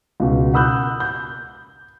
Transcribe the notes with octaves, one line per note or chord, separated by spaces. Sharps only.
C#2 B2
F#5 B5 D#6 E6 F#6 G6
G6